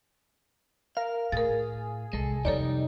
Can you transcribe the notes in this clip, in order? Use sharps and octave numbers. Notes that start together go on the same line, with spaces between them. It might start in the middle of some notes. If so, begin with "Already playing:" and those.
A#4 F5
A2 G#4 A#4 A6
C2 G#3 A4
F2 C3 G3 D#4 A4 C#5 D5